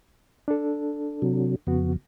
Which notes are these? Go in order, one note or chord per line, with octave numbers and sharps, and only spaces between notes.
D4 A4
C3 F#3
F2 C#3 B3 F#4